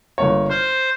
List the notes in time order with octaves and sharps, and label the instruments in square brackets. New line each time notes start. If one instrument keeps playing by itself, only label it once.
[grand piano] G1 A#3 C#5
[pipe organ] C5 [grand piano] F6 G6